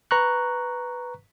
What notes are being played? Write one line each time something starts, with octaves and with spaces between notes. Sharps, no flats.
B4 A#5 C#6 F#6